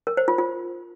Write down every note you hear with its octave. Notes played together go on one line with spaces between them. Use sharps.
A#4
C5
F4
F4